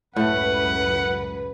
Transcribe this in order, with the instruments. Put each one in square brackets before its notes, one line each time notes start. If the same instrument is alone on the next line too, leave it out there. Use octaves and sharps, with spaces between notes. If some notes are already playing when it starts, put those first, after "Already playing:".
[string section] C#2 F#2 B4 [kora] A2 A3 [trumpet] F#5